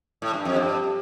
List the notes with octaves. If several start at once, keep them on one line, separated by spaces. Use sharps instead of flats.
A2
G2
F2
G2